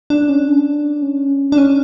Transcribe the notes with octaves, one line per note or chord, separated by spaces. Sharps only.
D4
C#4
D4
C#4
D4
C#4